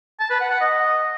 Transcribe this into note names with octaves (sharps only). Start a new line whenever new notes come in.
A5
B4
F#5
F#5
D#5